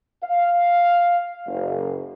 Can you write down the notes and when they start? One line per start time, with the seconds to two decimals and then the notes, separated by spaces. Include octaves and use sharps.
0.23 F5
1.46 F#1